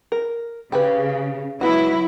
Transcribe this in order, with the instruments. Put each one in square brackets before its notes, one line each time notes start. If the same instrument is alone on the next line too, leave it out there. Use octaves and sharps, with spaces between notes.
[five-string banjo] A#4
[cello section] C#3 [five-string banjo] G4 G#4 B4
[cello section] F#3 E4 [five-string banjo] G#3 B3 F#4